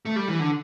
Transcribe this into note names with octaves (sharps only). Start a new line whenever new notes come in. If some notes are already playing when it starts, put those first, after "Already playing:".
A3
G3
E3
D3